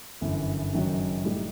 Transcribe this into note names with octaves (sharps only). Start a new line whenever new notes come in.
G1 F#2 E3
F#1 F#2 D#3 F#3
A2 G3 D#4